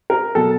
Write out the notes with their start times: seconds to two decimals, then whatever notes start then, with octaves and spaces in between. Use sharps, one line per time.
0.10 A#4
0.35 B2 F#3 A4